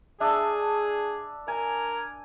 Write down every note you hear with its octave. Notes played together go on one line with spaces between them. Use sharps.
D4 G#4 E5
A#4 G#5